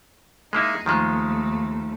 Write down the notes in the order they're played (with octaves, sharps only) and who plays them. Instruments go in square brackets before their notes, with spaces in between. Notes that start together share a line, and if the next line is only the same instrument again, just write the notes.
[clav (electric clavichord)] G#3 A#3 E4 [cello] D#4 G#4
[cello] D#2 A3 [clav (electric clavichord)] D#3 F3 G#3